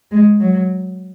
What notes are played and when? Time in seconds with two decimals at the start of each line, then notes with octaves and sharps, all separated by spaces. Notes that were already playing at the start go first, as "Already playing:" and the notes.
0.11 G#3
0.40 F#3